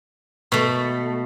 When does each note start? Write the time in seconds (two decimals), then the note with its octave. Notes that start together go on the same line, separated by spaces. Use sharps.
0.52 B2 A3